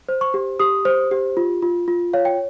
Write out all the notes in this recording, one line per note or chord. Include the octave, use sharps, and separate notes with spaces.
C5
C#6
G4
G4 D#6
C5
G4
F4
F4
F4
C#5 F5
G5